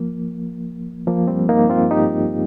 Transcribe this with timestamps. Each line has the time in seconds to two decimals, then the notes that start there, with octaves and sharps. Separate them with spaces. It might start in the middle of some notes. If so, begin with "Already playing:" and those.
Already playing: F3 A#3
1.07 F3 A#3
1.28 G3 C4
1.49 A#3 D#4
1.70 C4 F4
1.91 D#4 G4